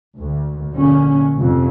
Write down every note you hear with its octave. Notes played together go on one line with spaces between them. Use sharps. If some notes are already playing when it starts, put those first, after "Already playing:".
D2
A#1 A#2 D3 C#4
F1 F2